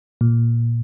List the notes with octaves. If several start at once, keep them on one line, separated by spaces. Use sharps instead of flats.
A#2